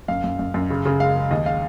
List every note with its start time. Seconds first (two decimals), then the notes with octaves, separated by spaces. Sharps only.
0.08 F#2 F5
0.24 F#2
0.39 F#2
0.54 F#2
0.70 C#3
0.85 C#3
1.00 G#3 F5
1.16 G#3
1.31 D#2 D#5
1.46 G#3 F5